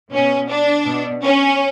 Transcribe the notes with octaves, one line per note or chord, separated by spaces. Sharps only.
B2 C#4
D4
B2
C#4